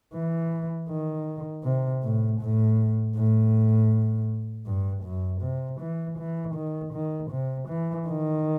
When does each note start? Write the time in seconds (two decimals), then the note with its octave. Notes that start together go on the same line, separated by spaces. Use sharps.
0.14 E3
0.89 D#3
1.64 C3
2.03 A2
2.41 A2
3.16 A2
4.67 G2
5.05 F#2
5.42 C3
5.81 E3
6.19 E3
6.55 D#3
6.94 D#3
7.31 C3
7.69 E3
8.08 D#3